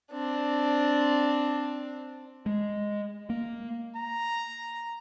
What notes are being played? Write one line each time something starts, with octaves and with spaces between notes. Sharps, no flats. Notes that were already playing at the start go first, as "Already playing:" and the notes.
C4 D4
G#3
A#3
A#5